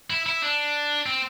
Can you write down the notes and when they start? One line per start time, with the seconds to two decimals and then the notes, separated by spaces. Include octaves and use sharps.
0.10 E4
0.26 E4
0.42 D4
1.06 C4